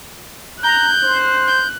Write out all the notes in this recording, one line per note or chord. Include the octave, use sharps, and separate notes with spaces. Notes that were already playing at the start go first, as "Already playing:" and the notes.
A#5 F#6 G6
C5
G6